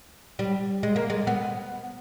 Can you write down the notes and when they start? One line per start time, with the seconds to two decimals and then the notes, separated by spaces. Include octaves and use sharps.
0.39 G3
0.83 G#3
0.96 A#3
1.10 G#3
1.27 B3